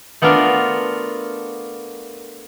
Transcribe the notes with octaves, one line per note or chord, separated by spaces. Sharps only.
A3 B3 D4 F4 A#4